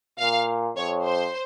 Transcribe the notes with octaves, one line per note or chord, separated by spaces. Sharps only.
A#2 F5
F2 C#5
C5